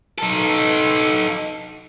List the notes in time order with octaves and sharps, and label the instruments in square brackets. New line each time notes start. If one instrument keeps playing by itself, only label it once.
[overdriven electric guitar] D#4 A4